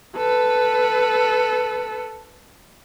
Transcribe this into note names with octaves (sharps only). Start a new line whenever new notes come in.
A4 B4